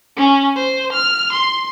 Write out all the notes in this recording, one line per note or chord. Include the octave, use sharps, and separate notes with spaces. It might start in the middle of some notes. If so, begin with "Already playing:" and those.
C#4
C5
F6
C6